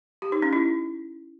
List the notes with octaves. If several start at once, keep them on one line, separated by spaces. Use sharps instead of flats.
G4
D#4
C#4
E4